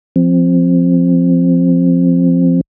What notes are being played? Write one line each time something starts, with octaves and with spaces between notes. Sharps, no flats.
F3 C4